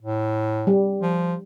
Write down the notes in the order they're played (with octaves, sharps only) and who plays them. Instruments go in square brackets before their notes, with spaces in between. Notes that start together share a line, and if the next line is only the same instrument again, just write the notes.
[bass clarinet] A2
[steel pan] G3
[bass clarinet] F3